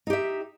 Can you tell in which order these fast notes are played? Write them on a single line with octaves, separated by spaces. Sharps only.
D#4 G4 E5